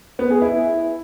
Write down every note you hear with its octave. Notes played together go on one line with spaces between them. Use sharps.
B3
G#4
E4